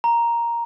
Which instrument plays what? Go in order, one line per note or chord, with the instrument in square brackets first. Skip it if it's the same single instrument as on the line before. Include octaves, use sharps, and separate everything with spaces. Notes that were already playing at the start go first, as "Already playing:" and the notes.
[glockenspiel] A#5